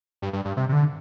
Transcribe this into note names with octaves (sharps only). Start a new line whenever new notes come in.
G2
G2
G2
C3
C3
D3